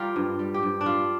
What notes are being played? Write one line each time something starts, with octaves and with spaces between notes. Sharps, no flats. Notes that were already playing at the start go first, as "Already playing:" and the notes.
Already playing: G3 F4 G4 A#4
G2
G3
G4
G2
D4
G3 F4